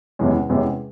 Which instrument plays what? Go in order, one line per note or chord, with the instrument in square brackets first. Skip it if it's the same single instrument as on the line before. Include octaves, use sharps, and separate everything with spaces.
[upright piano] E2 C3 E3 G#3 C#4
E2 C3 E3 G#3 C#4